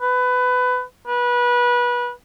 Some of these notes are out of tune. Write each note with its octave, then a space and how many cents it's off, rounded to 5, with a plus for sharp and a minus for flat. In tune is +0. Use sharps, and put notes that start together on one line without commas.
B4 +20
B4 -25